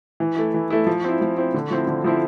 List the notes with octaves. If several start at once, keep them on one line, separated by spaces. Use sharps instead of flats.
E3
A3 E4
E3
A3 E4
F3
C4 E4
F3
C4 E4
D3
F3 C4 E4
D3
F3 C4 E4